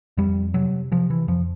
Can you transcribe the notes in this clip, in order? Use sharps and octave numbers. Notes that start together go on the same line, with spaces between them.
F2 G3
C3 F#3
C3 F3
E3
F2 F3